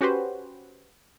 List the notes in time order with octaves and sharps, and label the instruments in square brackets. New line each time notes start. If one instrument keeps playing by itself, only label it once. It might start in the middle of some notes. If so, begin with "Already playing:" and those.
[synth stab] C#4 F#4 G4 B4 C5